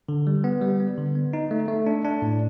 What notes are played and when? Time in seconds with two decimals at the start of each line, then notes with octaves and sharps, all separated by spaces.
0.09 D3
0.27 G3
0.44 B3
0.61 G3
0.80 B3
0.98 D3
1.15 B3
1.33 D#4
1.51 A3
1.68 A3
1.87 D4
2.05 D4
2.22 A2